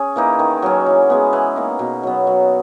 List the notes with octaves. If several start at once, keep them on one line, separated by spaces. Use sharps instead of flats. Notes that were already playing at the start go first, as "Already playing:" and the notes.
Already playing: C#4 G#4
E3 A#3 D#4
D#3
F#3 C#4
E3
G#3 B3
E3
A#3 D#4
B2
F#3 B3
F#3